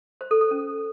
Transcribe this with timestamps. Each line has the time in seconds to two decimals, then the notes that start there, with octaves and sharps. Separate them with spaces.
0.21 C5
0.31 A4
0.41 A4
0.51 C#4